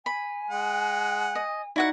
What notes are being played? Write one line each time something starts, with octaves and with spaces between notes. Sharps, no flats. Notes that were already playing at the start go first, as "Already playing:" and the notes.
G#5 B5
G#3 F#5
D#5
D#4 E4 F#4 D5 F#5